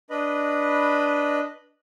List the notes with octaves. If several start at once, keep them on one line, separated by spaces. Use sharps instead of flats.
D4 B4 D#5 B5